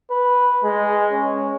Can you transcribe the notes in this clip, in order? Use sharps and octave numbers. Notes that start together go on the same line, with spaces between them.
B4
G#3
C#4